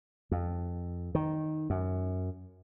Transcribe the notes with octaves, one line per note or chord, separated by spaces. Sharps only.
F2
D#3
F#2